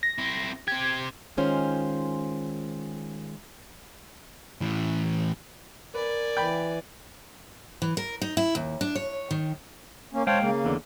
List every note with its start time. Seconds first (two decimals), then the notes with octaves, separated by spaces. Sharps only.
0.03 A#6
0.18 C4 E4
0.68 C4 G4 G#6
1.37 D#3 G#3 C#4 F4 C5 G#5
4.61 A2 E3
5.95 A#4 B4 D5 G#5
6.37 E3 G5 B5
7.82 E3
7.97 A#4
8.22 D#4
8.37 E4
8.55 D#2
8.81 D4
8.95 C#5
9.31 D#3
10.13 A#3 C#4
10.27 G#3 C5 C#5 F5 G5 A5
10.41 C#3 A#3
10.64 E2 D3